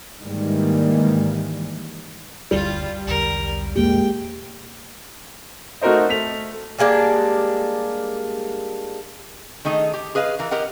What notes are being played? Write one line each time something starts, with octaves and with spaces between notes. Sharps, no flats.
G#2 D#3 E3 G3 G#3 A#3
F#1 D2 G3 F4
B1 E2 D3 A#4
E2 A#2 G#3 A#3 G4 G5
A3 D#4 F#4 A#4 C5 D#5
A3 B6 F7
G3 G#3 A#3 D4
D#3 A3 D#4 G#4
G4
G#4 B4 D#5 F5
E3 A#4
G4 A#4 D#5 F#5